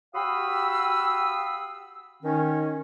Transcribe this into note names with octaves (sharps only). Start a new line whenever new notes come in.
F#4 G4 F5 B5 D#6 E6
D#3 C#4